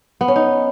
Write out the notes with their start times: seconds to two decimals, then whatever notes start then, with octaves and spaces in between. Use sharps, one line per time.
0.21 B3
0.28 C#4
0.36 D#4